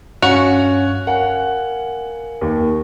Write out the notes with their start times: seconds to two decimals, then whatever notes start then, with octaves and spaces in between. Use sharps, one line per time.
0.22 G2 C#4 F#4 F5 C#7 F7
1.07 A#4 F5 F#5 G#5
2.41 D#2